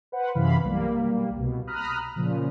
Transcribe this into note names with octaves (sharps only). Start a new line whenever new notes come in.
B4 C5 F#5
F#2 C3 E3 F5 B5
B1 G3 A#3
C2 B2
A#5 B5 D#6 F6 F#6
A#2 C#3 F3